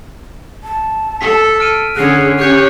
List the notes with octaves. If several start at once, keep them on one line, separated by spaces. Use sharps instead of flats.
A5
A4 B6
A5 F6 D7 D#7
D3 C#4 G#4 F#6 C7
C#4 G4 C#5 F#6 G6